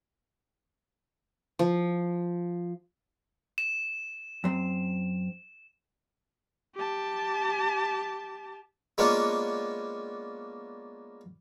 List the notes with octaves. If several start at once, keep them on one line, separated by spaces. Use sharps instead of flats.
F3
E7
F#2 C4
G4 A5
G#3 A#3 B3 C#4 D4 F4